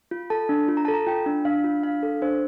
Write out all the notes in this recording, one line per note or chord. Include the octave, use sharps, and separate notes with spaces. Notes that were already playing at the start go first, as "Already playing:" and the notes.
F4
A4 A5
D4
F4
A#5
A4 A5
A#5
F4 G5
D4
D4 F5
F4
D4 F5
A4
D4 C5